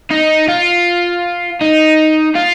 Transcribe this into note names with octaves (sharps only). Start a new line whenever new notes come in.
D#4
F4
D#4
F4